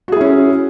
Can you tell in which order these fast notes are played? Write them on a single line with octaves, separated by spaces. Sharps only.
F#4 G#4 E4 C#4